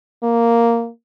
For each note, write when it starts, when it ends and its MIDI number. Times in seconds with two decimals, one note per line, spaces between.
0.23 0.89 58